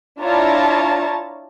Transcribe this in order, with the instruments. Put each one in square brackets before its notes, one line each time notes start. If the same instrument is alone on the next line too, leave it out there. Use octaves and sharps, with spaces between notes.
[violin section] D4 E4 F4 C#5 A5 A#5